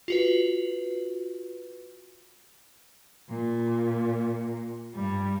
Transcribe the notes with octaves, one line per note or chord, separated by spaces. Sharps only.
F4 F#4 B4
A#2
G2 G3